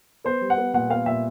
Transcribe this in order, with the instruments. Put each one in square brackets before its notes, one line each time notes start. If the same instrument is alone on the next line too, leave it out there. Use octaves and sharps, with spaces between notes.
[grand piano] B3 [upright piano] C5
[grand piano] G3
[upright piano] F#5
[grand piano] B3
[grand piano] A#2 [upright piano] F#5
[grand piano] B3 [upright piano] F5
[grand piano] A#2 [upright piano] E5